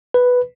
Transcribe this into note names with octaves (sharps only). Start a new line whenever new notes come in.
B4